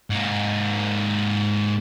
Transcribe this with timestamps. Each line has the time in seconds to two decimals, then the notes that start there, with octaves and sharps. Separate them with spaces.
0.10 G#2 A#3